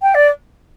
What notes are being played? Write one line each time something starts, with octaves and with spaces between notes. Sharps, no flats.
G5
D5